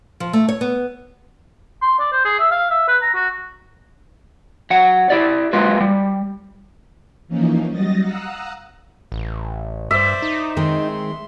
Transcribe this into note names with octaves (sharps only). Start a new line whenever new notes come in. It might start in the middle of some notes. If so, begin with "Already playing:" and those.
F3
A3
C#5
B3
C6
D5
C5
G#4
E5
F5
E5
B4
A#5
F#4
F#3 F#5
E4 G4 D5
F#3 G#3 A#3 C4 F4 B4
G3
E3 F3 A#3 C#4 D#4
F#3 G3 D#5 A6 A#6
F5 F#5 A#5 D#6 E6 F#6
A1
G2 C5 D5 E5
D#4
D#3 G#3 C4 C6